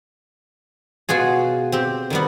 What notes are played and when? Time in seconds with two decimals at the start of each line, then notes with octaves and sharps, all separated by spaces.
1.09 B2 F4 F#4 G#4
1.72 C4 G4
2.10 D#3 G3 B3